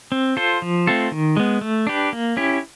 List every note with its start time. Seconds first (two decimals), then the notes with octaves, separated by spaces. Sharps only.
0.12 C4
0.37 F4 A4 C5
0.62 F3
0.87 A3 C4 F4 A4
1.12 D#3
1.37 G#3 B3
1.61 A3
1.87 D4 G4 B4
2.13 A#3
2.37 C#4 E4 G4